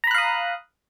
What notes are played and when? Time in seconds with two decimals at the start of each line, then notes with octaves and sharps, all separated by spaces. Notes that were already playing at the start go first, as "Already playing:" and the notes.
0.04 A#5
0.07 B5
0.11 F#6
0.15 F5
0.18 D#6